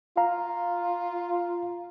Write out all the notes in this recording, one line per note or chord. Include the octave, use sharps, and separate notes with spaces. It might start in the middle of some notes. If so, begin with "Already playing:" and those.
F4 F5 A#5